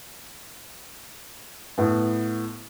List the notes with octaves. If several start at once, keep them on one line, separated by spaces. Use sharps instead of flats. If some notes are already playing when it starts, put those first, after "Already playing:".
A2 B3